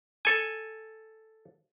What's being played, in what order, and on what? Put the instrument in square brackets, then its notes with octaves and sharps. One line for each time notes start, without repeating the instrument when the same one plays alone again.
[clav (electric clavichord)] A4 G#5